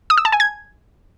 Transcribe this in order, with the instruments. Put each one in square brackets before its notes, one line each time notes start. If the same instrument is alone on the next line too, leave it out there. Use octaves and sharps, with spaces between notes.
[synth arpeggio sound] D#6
E6
A5
G#5
G#6